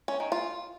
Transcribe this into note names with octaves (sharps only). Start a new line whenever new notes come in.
C#4
D#3
F4